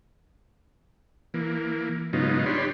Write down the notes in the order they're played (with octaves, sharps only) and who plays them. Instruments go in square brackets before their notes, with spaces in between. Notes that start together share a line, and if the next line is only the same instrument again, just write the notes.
[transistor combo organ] E3 A#3
G#2 C#3 F#3 B3 D#4 F4
D4 G4 C#5 B5 C6